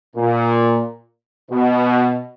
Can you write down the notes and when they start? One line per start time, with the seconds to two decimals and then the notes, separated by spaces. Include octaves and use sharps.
0.15 A#2
1.50 B2